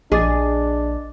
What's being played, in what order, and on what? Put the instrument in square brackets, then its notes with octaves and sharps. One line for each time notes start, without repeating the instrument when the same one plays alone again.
[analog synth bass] A#1 [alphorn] D4 [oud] G#4 [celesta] D#5 D6 A6